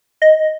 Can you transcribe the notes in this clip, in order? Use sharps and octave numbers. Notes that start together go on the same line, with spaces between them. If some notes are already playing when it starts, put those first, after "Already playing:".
D#5